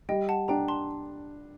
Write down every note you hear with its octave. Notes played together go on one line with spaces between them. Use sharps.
G3 D#5 G5
F#5 A5
D4 G5 A#5
A5 C6